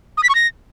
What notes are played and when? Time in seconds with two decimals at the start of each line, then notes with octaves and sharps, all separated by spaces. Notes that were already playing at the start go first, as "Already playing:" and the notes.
0.17 D#6
0.23 B6
0.29 C#6
0.35 A#6